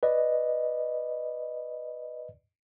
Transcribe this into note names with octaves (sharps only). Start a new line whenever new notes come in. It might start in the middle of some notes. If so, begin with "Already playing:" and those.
B4 D5 D#5